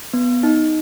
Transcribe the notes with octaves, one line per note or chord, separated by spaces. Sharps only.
B3
D#4